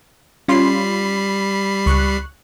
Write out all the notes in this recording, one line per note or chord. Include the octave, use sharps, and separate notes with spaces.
G3 C#4 F4 B5 C6 C7
C#2 C#6 F#6